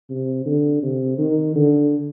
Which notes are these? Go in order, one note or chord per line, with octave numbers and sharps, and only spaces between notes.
C3
D3
C3
D#3
D3